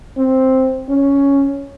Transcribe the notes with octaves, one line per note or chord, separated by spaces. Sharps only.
C4
C#4